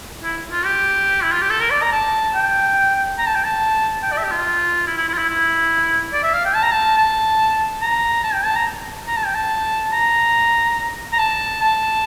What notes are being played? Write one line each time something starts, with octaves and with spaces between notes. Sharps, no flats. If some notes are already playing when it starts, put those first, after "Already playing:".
E4
F4
G4
E4
F4
G4
A4
A#4
D5
A#5
A5
G5
A#5
A5
G5
A5
G5
D5
E5
G4
F4
E4
E4
E4
F4
E4
E4
D5
E5
F5
G5
A5
A#5
A5
A5
A#5
A5
G5
A5
A#5
A#5
A5
G5
A5
A#5
A#5
A5
A5